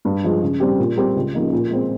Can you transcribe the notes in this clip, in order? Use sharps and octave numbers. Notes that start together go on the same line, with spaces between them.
G2
F3 G#3
C#3
G3 C4 G4
A#2
G3 C4 G4 A#4
C#2
C#3 F3 A#3 D#4
A#2
G#3 C4